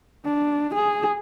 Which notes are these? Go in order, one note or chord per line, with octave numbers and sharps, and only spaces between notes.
D4
G#4